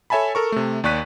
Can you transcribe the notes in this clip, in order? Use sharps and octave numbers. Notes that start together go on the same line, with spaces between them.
A4 C#5 E5 G#5 A5 B5
A4 A#4 C#6
C3 A3
D#2 D5 C#6 F#6 B6 D#7